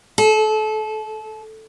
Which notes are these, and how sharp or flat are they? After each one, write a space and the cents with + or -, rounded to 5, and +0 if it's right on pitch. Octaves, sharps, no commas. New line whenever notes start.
A4 -30